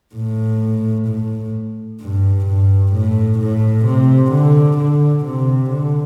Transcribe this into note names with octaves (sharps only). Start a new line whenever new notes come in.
A2
A2
G2
G2
A2
A2
C3
D3
D3
C3
D3